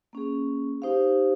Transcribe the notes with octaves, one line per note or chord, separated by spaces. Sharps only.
A#3 C#4 G#4
D#4 G4 C5 F5